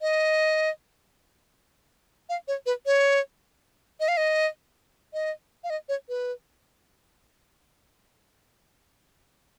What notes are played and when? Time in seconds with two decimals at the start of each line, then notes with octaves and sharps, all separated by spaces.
0.02 D#5
2.29 F5
2.48 C#5
2.66 B4
2.86 C#5
4.00 D#5
4.08 F5
4.17 D#5
5.13 D#5
5.64 F5
5.70 D#5
5.89 C#5
6.09 B4